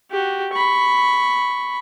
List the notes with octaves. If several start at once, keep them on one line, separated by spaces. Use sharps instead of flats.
F#4 G4
B5 C#6